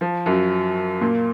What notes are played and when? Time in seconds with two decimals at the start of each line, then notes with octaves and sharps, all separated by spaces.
0.01 F3
0.26 F#2 F#3
1.01 A#2 A#3